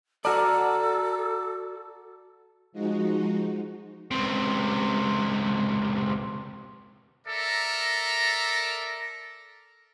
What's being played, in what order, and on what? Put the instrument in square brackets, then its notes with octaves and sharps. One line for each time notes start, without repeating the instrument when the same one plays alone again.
[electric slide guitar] F#4 D5 [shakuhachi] A4 [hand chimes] A5 A#5 F6
[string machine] F3 G#3 D#4 F#4
[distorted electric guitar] C#2 C3
[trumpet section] A4 A#4 D5 E5 A#5